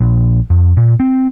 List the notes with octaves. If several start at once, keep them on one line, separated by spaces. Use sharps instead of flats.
A#1
F2
A#2
C4